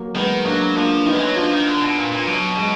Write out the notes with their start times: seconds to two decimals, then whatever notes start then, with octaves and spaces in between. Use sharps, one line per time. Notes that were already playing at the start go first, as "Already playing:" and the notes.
Already playing: F#3 A#3
0.15 D#3 G#3 B3
0.45 F#3 A#3 D4
0.76 F3 A#3 D4
1.06 D#3 B3 D#4
1.15 G#3
1.21 F#3
1.36 F3 D4 F4
1.52 D#3
1.67 D3
1.82 B2
1.97 A#2
2.12 A#2
2.27 B2 F#3
2.57 G#3